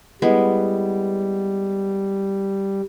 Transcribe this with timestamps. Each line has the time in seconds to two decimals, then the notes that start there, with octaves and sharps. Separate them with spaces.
0.22 G3 G#3 B3 E4